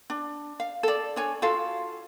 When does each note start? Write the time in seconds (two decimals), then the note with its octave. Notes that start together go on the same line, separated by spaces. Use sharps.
0.10 D4
0.60 F5
0.83 A4 D5
1.16 D4 C#5 G#5
1.42 F4 F#4 A4 F5